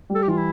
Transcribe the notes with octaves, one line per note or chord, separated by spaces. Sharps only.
G3 A4
G4
E3 F4
E4